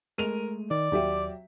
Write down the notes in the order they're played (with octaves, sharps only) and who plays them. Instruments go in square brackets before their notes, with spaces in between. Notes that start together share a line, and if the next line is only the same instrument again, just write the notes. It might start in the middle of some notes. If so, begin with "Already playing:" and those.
[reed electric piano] G#3 A3 [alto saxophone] A#4 [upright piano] D#7 F7
[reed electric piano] D#3 [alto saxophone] D5
[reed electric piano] D#2 D6 [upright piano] F#3 G4 E5